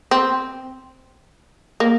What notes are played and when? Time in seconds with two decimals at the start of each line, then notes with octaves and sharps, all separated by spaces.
0.11 C4
1.80 A#3